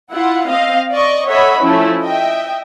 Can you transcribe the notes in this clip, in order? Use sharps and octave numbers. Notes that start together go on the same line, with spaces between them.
E4 F4 F#5
C4 D#5 F5
D5 D#5 C#6
A4 C#5 D#5 E5 F#5 B5
F3 A3 C#4 E4
D#5 E5 G5